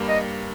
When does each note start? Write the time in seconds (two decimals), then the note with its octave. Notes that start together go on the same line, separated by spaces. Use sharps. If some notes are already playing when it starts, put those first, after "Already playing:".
Already playing: G2 G3 A#3
0.09 D#5